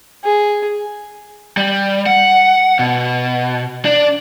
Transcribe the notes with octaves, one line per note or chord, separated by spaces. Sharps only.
G#4
G3
F#5
B2
D4